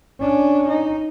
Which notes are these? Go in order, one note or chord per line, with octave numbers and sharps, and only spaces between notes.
C#4 D4
D#4